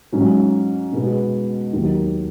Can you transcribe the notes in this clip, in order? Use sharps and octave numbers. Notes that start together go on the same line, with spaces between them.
G#2 F#3 C#4 F#4
B2 G#3 B3 F#4
D#2 D#3 F#3 A#3